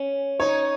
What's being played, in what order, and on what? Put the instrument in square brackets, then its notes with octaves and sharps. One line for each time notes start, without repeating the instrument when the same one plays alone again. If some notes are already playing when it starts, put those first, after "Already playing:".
Already playing: [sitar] C#4
[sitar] D#4 [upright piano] C#5